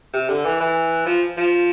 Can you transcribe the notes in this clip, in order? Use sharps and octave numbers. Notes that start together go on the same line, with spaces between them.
C3
D3
E3
E3
F3
F3